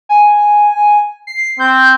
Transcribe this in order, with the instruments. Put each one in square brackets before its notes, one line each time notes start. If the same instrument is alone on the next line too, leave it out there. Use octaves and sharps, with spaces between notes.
[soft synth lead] G#5
C7
[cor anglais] C4 [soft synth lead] G6